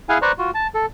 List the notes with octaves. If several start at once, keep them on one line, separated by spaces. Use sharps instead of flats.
E4 G#4 F5 F#5 G#5
B4 C5 D5 A#5 C#6
F4 F#4
A5
A4